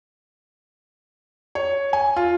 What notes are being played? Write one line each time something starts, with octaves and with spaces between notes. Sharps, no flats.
C#5
G#5
F4